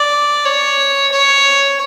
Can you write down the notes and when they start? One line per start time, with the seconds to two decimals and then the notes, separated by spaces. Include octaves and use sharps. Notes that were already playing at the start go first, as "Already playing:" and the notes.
Already playing: D5
0.45 C#5
1.12 C#5